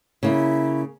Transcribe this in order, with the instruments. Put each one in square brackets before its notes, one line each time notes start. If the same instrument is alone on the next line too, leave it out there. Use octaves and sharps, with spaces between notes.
[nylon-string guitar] C#3 A#3 [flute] E4